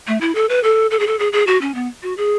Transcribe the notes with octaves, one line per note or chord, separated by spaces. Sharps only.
A3
E4
A4
B4
A4
A4
G#4
A4
G#4
G#4
F#4
C#4
B3
F#4
G#4